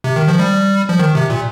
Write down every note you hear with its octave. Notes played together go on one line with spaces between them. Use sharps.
C3
D#3
F3
G3
F3
D#3
C3
A#2